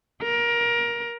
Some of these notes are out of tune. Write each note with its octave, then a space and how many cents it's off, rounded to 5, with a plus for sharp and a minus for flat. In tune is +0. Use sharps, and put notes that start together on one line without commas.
A#4 +20